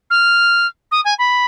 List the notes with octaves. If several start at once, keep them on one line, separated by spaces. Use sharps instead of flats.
F6
D#6
G#5
B5